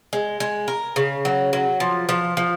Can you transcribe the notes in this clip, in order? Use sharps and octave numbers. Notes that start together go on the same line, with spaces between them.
G#3
G#3
A#4
C#3
F#3
F#3
F3
F3
F3